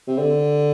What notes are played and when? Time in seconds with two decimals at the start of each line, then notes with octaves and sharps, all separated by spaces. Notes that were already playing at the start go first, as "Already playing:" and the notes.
0.08 C3
0.18 D3